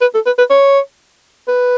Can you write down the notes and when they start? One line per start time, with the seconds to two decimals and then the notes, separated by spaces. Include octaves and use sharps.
0.01 B4
0.14 A4
0.26 B4
0.38 B4
0.50 C#5
1.48 B4